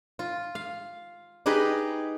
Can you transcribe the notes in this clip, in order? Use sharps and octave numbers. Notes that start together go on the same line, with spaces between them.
F4
F5
D#4 G4 G#4 B4 D#5